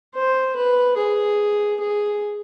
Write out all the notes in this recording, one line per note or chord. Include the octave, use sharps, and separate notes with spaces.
C5
B4
G#4
G#4